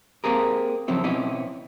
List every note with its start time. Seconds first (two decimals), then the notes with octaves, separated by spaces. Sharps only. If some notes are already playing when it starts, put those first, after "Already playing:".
0.24 A#3 C4 G4 G#4 A#4
0.88 F2 C#3 F3 F#3 C4 E4
1.04 B2 C4 C#4 E4 D#5